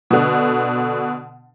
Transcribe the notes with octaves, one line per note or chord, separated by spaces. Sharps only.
B2 D3